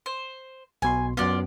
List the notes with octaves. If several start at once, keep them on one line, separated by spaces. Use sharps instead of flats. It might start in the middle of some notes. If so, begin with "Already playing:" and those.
C5
B1 B2 G#5 C6
F#2 F#3 B3 F4 D5